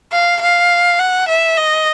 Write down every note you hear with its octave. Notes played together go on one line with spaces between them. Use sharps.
F5
F5
F#5
E5
D#5